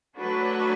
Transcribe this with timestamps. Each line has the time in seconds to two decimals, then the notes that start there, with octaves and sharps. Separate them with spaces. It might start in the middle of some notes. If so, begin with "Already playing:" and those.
0.17 F#3 A3 D4 F#4 B4